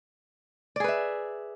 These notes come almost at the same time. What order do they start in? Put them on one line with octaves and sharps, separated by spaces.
D5 G#4 B4 E5